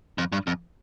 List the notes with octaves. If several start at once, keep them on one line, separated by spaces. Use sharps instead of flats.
F2
G2
F2